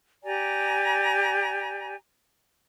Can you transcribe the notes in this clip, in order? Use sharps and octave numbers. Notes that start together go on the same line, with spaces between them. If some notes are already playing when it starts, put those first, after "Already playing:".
G4 D5 G#5 A#5